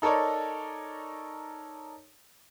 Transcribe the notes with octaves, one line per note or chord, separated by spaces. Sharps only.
D#4 A4 A#4 C#5 D5